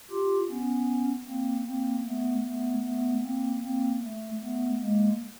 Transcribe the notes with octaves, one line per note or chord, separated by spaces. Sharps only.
F4 G4
B3 C#4
A#3 C4
A#3 C4
A3 B3
A3 B3
A3 B3
A#3 C4
A#3 C4
A3
A3 B3
G#3 A#3